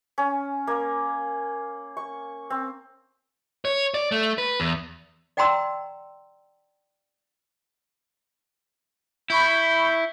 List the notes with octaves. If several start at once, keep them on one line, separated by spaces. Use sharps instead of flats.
C#4
A#3
C#6
C4
C#5
D5
A3
B4
E2
D5 F#5 G5 A#5 C6 E6
E4 B5 C#6 G6